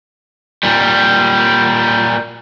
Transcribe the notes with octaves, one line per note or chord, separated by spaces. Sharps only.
A#2 G3